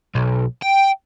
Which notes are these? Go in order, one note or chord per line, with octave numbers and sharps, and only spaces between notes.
B1
G5